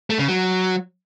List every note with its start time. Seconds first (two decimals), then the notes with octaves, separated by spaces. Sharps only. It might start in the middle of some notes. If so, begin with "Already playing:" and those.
0.10 A3
0.19 C#3
0.28 F#3